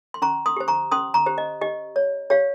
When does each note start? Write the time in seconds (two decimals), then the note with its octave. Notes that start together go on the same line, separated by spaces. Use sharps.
0.14 C6
0.22 C#4 A#5 C#6
0.46 C6 D#6
0.57 G4 C5
0.68 A#5 C#6
0.92 C#4 C6 D#6
1.14 A#5 C#6
1.26 G4 C5
1.38 D#5
1.61 G4 D#5
1.96 C#5
2.30 G4 C#5 F5